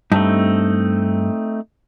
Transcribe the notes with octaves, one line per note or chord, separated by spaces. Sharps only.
G2 A3 C4 D#4